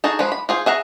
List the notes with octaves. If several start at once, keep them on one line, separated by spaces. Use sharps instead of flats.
D#4 F#4 G#4 A4
F3 G#3 B4
B5
F4 G#4 C5
G#4 E5 F#5 A#5